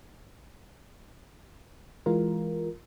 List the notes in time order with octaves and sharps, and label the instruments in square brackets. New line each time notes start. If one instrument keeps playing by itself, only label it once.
[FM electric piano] E3 G#3 F4 A#4